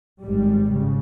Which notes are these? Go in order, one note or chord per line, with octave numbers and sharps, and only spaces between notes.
G#1 G#2 G3
C#3